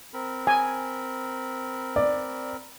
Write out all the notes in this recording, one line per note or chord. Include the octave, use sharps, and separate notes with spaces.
C4 A#4 B5
G#5
D5